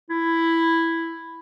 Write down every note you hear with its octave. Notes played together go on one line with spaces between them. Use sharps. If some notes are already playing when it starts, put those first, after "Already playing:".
E4